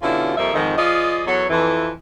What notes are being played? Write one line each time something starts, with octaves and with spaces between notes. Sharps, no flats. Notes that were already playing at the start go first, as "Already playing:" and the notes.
B2 D3 G3 C#4 E4 F4
F2 G3 A#3 A4 D#5 E5
F2 G#2 D#3
F3 F4 G#4 D5 D#5
E2 F#3 B3 A4 C#5
F2 E3